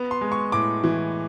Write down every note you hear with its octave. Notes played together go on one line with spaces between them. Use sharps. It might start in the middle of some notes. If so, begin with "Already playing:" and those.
Already playing: B3
C6
G#3
C#6
A2 D6
E3